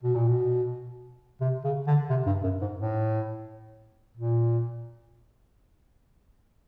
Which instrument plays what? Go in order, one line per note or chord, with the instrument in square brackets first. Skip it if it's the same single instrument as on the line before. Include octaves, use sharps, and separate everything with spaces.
[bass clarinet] B2
A#2
B2
C3
C#3
D3
C3
G2
F#2
G#2
A2
A#2